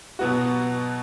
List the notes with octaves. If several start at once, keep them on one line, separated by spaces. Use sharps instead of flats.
B2 F#3 B3 F#4